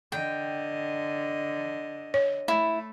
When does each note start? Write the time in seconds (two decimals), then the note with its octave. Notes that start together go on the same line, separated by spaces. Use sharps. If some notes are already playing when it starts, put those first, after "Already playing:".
0.12 D3 D#5 G5
2.14 C#5
2.48 A3 E4